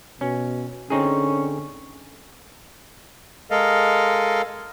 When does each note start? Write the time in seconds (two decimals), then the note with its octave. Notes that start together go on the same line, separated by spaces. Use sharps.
0.21 B2 C#4
0.90 D3 C4 C#4 D#4 G#4
3.51 G#3 A4 A#4 D#5 F5